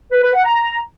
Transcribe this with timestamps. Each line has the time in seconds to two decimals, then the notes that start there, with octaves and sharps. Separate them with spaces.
0.11 B4
0.22 B4
0.34 F#5
0.45 A#5